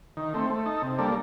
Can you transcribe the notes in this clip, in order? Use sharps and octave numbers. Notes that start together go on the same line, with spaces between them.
D#3
A3 C4
A3
D#4 A4
C3
G3 A#3 D4 A4